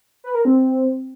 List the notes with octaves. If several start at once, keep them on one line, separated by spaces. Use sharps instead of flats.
B4
A#4
C4